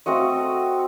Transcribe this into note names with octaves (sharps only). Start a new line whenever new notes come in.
A3 C4 F#4 D#5